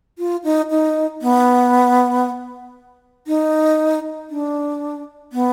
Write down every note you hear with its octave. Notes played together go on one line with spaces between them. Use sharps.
F4
D#4
D#4
B3
D#4
D4
B3